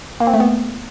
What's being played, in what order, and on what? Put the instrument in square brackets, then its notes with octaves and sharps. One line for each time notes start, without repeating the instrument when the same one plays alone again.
[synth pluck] A#3
C4
A3
B3